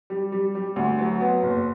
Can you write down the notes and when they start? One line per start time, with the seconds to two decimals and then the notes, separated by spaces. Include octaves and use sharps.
0.10 G3
0.32 G3
0.55 G3
0.76 D2
0.99 F#3
1.20 B3
1.43 F#1